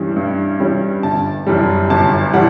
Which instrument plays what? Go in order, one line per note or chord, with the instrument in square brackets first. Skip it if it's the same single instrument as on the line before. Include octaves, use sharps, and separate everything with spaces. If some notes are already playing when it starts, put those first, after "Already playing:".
Already playing: [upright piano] G2 E3 G3 C#4
G2
E3 G3 C#4
G1 A5
F#2 E3 G3
G1 A5
E3 G3 F#5